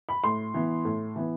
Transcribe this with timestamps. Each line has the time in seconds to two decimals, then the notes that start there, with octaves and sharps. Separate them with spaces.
0.09 B5
0.24 A2 C6
0.54 E3 B3
0.85 A2
1.16 E3 B3